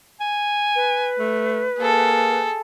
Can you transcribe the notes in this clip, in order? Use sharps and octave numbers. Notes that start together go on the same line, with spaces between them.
G#5
B4
A3
A#3 G#4 A4